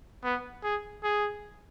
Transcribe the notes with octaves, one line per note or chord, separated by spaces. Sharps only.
B3
G#4
G#4